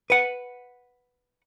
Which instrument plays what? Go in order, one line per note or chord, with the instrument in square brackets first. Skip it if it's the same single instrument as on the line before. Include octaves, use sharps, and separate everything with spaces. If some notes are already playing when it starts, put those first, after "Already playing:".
[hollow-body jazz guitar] B4 F#5